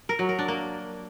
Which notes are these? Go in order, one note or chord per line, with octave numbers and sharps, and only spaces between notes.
A#4
F#3
A#4
D4
A#3